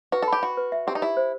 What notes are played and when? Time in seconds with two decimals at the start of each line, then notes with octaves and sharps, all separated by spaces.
0.12 F#4 B4
0.22 A4
0.28 G4 B5
0.42 F#4 B5
0.57 B4
0.72 E5
0.87 C4 G4
0.95 D#4
1.02 E4 G4
1.17 C5